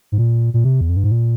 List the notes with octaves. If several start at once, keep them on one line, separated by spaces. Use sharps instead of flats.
G#2
A#2
A#2
C3
E2
F2
G2
G#2
A#2